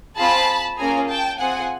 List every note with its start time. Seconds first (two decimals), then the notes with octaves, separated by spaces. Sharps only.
0.16 C4 F4 G#4 A5 B5
0.77 A#3 C#4 F4 G#4 G#5 A#5
1.08 G5 A5
1.39 C4 F4 G#4 F#5 G#5